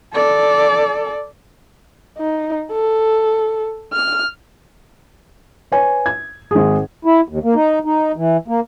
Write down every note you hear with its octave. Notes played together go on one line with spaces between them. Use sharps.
A4 D5
D#4
A4
F6
B4 C#5 G#5
G#6
G#1 G#4
E4
D#2
A#3
D#4
D#4
E3
A#3